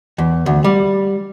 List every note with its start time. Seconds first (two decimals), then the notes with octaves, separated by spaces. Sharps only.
0.18 E2
0.46 D2
0.64 G3